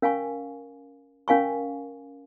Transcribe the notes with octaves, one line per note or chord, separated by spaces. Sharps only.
C#4 A#4 F5 G#5 C#6
C#4 A#4 F5 G#5 C#6